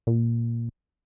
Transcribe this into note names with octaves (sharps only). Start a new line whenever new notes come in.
A#2